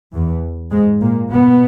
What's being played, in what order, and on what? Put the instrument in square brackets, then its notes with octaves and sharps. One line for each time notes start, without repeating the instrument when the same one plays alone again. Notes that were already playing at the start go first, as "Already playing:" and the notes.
[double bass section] E2 E3
G#2 G#3
A#2 A#3
B2 B3